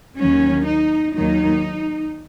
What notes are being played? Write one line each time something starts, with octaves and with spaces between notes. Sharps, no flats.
D#2 D#3 F#3 C#4
D#4
D#2 D#3 F#3 D#4